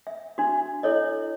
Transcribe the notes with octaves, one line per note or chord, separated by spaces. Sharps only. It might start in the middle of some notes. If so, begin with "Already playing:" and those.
E5
D4 F#4
E4 A4 C#5 D#5